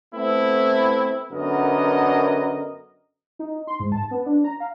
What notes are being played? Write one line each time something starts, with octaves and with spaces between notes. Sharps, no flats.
A3 B3 C4 E4
F#2 D3 B3 A#4 D#5
D#4
C6
G#2
A5
B3
D4
A#5
F5